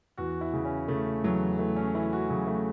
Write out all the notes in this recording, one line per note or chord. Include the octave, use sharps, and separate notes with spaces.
E2 F#4
E4
C#3
C#4
C#3 A3
E2 F#3
E3 A3
C#4
E3 E4
F#4
C#3 F#3
A3